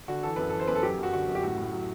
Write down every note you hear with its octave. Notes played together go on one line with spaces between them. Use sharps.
D3 F#4
E3 A4
F#2 B4
E3 A4
C5
F#2 B4
A4
F#3 G4
F#2 F#4
D3 F#4
F#2
G4
A2 F#4
A2
F#3